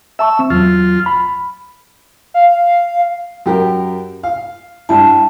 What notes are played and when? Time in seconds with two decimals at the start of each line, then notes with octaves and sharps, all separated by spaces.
0.19 E5 A5 C#6 E6
0.39 C4
0.50 E2 F#3 F4
1.06 B5
2.34 F5
3.46 F#2 G4 A#4
4.23 F5
4.89 G2 E4 A5